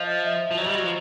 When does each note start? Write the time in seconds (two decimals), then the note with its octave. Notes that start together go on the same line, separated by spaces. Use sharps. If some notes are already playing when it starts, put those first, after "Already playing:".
Already playing: F3 D#5
0.22 E5
0.51 F3
0.57 F#3 D#5
0.66 G3
0.75 F#3
0.84 F3